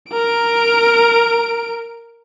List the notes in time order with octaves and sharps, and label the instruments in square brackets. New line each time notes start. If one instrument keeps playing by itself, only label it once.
[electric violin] A#4 D7